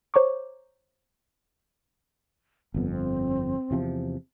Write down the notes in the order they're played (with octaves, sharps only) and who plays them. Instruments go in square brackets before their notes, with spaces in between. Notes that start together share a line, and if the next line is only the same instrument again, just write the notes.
[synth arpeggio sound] C5 C#5 A#5 C#6 D6
[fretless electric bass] G1 F2 [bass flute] B3
[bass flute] C4
[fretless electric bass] E2 C3 F3